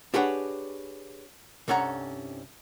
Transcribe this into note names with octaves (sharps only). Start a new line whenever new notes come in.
D4 G4 G#4 B4 C#5 F#5
C2 G2 C#4 A4 F#5 A#5